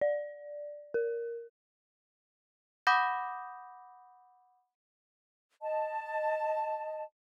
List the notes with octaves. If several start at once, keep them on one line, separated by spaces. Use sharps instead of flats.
D5
A#4
F#5 B5 D6 D#6 G6 A#6
D#5 A5